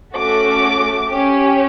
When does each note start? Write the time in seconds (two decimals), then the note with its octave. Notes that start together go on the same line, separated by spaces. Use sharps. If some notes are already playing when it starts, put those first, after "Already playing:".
0.15 A3 C#4 F#4 A4 D6
1.09 G4
1.14 C#4